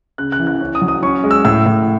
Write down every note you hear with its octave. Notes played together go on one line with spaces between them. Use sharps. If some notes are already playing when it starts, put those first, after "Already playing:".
C#3 F#6
F#6
E3
F#6
C#4
D#6
F#3
D#6
C#4 C#6
G#3
E6
A2 E6
A2